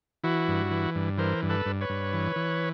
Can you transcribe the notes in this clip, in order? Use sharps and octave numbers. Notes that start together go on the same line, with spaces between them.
E3 E4 F#4
G2
E3
G2
E3 A#4 C5
G2
A4 B4
G2
B4 C#5
G2
E3
E3